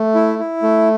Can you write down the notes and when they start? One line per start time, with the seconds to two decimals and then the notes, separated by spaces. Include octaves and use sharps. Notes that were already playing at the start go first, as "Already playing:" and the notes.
Already playing: A3
0.15 E4
0.39 E4
0.62 A3